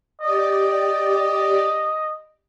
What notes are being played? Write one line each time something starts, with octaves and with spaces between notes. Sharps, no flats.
G4 D5 D#5